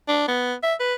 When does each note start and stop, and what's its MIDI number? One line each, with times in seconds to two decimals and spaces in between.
0.08 0.27 62
0.28 0.55 59
0.63 0.74 76
0.80 0.94 71